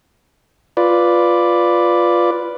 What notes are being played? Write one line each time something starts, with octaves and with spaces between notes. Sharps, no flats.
F4 B4 D5